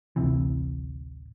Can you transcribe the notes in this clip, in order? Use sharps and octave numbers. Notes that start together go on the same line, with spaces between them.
D1 A1 C3 E3